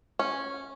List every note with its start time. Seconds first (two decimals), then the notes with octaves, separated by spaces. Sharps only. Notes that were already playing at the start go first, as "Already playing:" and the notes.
0.19 C#4